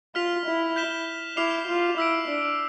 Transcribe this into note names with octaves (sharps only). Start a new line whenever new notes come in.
F4 F6 B6 F7
E4
G6 B6 E7 G7
E4 D6 F6 C7 F7
F4
E4 E6 B6 D7
D4